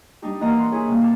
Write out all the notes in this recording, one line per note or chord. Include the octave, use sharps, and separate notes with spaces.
G3 D4 D#4 G4
E3 A#3 D#5 F#5 A#5 F6
F5 C6
E4 G#4 C#5
C3 G3 A#3
F5 A5 D6